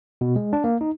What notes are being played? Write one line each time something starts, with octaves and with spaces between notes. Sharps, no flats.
B2
G#3
D4
A#3
D#4